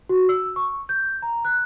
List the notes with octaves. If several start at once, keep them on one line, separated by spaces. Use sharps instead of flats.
F#4
E6
C#6
G6
A#5
F#6